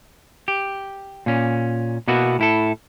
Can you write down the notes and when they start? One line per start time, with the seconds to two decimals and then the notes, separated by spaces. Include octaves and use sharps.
0.48 G4
1.26 A#2 C#4
2.08 B2 A#3 B3 E4 F#4
2.39 A2 E4 A4